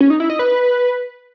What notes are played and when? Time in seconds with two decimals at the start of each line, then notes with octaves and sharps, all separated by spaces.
0.01 C#4
0.10 D#4
0.20 E4
0.30 D#5
0.39 B4